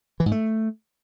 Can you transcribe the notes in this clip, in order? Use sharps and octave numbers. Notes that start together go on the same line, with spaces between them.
E3
G#2
A3